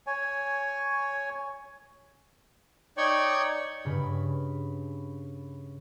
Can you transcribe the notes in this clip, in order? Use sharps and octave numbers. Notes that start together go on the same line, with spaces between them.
C#5 G#5
D#4 C#5 D5 G5 C#6
G2 C#3 B5